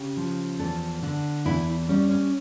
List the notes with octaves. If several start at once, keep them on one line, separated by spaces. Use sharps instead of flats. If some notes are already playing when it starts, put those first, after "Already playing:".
Already playing: C#3 G4
F3
E2 A4
D3
E2 E4
G3 C#4
C#4